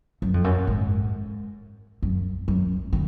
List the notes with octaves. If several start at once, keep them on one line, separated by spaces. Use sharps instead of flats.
F#2
F2
F#2
G#2
F#2
F#2
D3